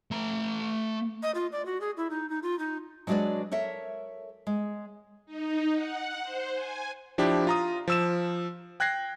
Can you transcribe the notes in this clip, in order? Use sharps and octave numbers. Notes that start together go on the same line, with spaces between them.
A3 A#5
D#5
F4
D5
F#4
G#4
E4
D#4
D#4
F4
D#4
F#3 G#3 D4 F#4 B4 D5
A4 A#4 C#5 E5
G#3
D#4
F#5
C5
G#5
F3 D4 E4 G4
F4 A#5 D#6
F3 E6 E7
G5 F#6 G#6 A#6 C7